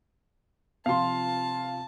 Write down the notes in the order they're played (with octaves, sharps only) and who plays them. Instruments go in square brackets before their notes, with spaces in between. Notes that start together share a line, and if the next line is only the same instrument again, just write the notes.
[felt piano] C3 F3 F4 [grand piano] F5 C6 [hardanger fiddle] A5